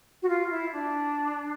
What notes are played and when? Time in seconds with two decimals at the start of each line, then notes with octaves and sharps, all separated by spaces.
0.22 F#4
0.28 F4
0.50 E4
0.72 D4